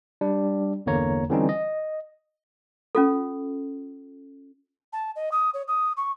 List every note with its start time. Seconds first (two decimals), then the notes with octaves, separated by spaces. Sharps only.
0.21 G3 D4
0.86 G1 E2 D3 A#3 C#5 A#5
1.30 D3 E3 G3 C4 C#4 D#4
1.49 D#5
2.95 C#4 F4 A4
4.93 A5
5.16 D#5
5.32 D#6
5.54 C#5
5.68 D#6
5.97 C#6